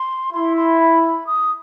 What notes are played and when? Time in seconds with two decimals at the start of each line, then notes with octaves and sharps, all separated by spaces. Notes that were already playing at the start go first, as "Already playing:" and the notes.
Already playing: C6
0.33 E4 C6
0.57 C6
0.80 B5
1.03 B5
1.26 D#6